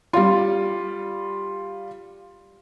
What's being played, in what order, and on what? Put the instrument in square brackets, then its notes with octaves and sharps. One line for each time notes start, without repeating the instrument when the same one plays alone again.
[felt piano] G3 F4